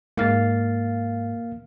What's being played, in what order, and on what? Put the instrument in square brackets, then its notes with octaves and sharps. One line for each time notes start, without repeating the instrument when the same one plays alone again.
[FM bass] G#2 [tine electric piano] A#3 F5 A6